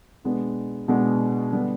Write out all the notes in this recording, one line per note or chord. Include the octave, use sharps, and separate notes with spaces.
B2 G#3 B3 D4
B2 G#3 B3 D4
D3 G3 B3 D4